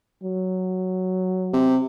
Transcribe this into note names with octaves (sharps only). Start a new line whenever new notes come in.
F#3
C3